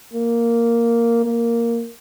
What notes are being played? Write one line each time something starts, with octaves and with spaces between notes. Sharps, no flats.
A#3
A#3